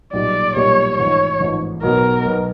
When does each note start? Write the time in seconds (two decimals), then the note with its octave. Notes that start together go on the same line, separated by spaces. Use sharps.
0.13 B1 A#2 G3 A#3 D5
0.56 B1 A#2 G3 A#3 C#5
0.98 A1 G#2 F3 C#5
1.40 A1 G#2 F3
1.83 B1 B2 F#3 B3 A#4
2.24 B1 B2 F#3 B3